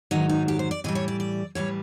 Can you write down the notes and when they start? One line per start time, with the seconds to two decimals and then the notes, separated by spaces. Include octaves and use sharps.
0.11 G#2 D#3 F#3 D#4
0.29 D#4
0.48 G4
0.59 C5
0.71 D5
0.84 A2 E3 G3 D#5
0.95 C#5
1.08 D5
1.20 D5
1.55 A2 E3 G3 C#5